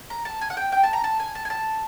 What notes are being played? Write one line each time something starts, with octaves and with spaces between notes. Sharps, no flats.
A#5
A5
G#5
F#5
G5
G5
A5
A#5
A5
G#5
A5
G#5
A5